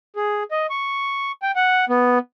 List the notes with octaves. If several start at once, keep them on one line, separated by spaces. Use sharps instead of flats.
G#4
D#5
C#6
G5
F#5
B3